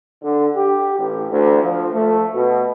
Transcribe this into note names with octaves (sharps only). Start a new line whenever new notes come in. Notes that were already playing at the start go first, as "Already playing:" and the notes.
D3
G4
A1
D2
F3
A3
B2